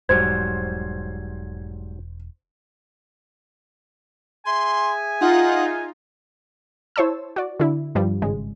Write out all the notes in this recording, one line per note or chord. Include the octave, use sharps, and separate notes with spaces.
E1 G#2 F#3 G3 C5 G#6
G#4 E5 G#5 C6
D#4 F4 F#5
E4 C5 C#5 A5 E6
F#4 D5
D3 E4
G2 F3 G3
G#1 C#3 G#3